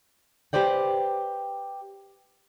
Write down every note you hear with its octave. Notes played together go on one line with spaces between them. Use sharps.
G4 B4 C5 D5 G5